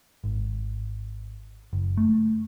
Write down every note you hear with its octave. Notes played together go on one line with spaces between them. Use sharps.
G#1
F#1
A3